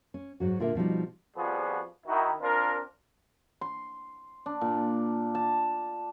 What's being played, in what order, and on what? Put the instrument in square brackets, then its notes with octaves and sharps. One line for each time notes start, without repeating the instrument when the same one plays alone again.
[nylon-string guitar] C#4
G#2 F#3 F#4
A#2 D3 F4 A#4 E5
B2 F3 G3 D#4
[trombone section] F2 F3 G3 B3 F#4 G#4
D#3 E4 F#4
C4 D4 F4 A#4
[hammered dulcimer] C6
D4
A#2
A5